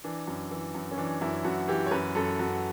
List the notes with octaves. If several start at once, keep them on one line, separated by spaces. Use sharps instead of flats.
E3 D4
F#2
E3
F#2
C#4
E3 D4
F#2 E4
F#2 F#4
E3 G4
C#5
F#2 B4
F#2 A4
F#2 F#4